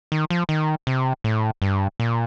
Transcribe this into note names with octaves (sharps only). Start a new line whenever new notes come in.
D#3
F3
D#3
C3
A2
G2
A#2